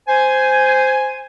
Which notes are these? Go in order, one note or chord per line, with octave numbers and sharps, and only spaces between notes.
C5 G#5